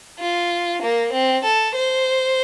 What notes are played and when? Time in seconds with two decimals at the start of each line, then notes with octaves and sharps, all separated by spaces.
0.19 F4
0.82 A#3
1.12 C4
1.44 A4
1.74 C5